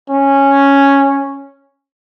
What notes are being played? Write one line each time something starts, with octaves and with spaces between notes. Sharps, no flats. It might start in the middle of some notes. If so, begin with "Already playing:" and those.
C#4